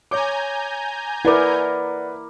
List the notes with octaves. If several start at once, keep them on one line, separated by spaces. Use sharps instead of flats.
C#5 G#5 A#5 D6 G6
E4 A#4 B4 D5 F#5 D6